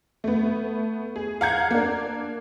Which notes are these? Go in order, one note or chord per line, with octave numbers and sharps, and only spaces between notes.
A3 B3
G#4
F5 F#5 A#5 F#6 G#6 C#7
A#3 D4